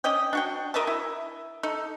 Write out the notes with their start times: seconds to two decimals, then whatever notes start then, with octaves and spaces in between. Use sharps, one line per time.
0.04 C#4 D5 D#5 G5
0.33 D4 F#4 G5
0.74 A#4 D#5 E5 A5
0.87 E4
1.63 D#4 A4